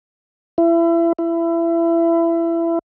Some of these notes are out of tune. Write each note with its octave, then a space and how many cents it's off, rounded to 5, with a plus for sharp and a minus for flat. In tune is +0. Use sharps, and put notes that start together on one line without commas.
E4 +30
E4 +25